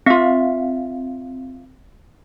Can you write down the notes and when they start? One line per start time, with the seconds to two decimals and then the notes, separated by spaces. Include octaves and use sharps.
0.06 C4 F4 E5